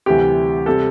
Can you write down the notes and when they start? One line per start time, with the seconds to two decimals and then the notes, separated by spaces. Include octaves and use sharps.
0.06 D2 C3 E3 G3 G4
0.66 C3 G3 A4